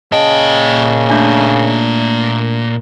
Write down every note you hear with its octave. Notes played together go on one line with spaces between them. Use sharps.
A#2 C#3 D#5 G5 A5
A3 D4 G#5